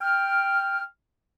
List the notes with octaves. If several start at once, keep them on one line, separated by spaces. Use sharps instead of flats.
G5 F6